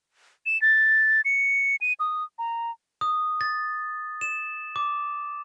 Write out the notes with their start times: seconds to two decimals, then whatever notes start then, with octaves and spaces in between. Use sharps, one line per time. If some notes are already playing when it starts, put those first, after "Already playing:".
0.46 E7
0.62 A6
1.25 C#7
1.81 D#7
2.00 D#6
2.39 A#5
3.01 D#6
3.41 A6
4.21 E7
4.76 D6